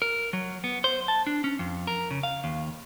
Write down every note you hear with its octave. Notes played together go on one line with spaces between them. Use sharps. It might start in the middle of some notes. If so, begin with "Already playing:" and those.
A#4
F#3
B3
C5
A5
D4
C#4
F2
A#4
C#3
F5
D#2